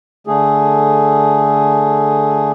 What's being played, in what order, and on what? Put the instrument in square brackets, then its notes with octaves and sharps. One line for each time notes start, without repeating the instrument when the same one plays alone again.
[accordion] D3 A3 G#4